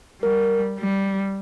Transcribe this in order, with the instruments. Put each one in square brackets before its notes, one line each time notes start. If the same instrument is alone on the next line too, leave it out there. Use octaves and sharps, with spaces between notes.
[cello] G3 [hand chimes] A#4
[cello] G3